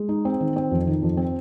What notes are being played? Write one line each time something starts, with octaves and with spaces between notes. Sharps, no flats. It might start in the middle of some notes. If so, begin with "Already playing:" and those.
Already playing: G#3
D#4
C4
D#3
C4
F2
D#3
F2
C4